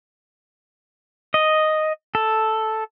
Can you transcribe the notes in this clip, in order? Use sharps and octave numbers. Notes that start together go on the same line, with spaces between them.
D#5
A4